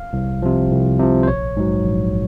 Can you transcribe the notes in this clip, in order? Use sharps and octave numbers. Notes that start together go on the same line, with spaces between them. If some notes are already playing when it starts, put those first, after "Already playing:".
Already playing: F5
C2
C3 F3
C2
C3 F3
C5
A#1 C#5
G#2 F#3
A#1